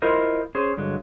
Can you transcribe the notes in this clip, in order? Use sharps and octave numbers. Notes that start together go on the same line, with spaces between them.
E4 F4 A#4 C5 D#5
C#4 G#4 C5
G2 D3 F#3 G#3